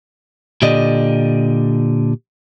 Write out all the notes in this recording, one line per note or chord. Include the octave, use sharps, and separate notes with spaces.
A#2 D3 G4 D5 D#5